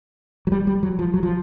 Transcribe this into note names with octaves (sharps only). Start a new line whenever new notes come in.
F#3
G3
G3
F#3
F3
F#3
F3